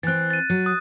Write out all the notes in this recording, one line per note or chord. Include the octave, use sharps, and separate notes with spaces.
E3 C4 F#6 A6
A6 D#7
F#3
D#6 F#6